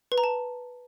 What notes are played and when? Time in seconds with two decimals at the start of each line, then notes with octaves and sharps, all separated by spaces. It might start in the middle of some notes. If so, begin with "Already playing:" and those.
0.12 B4
0.18 A#5
0.24 A5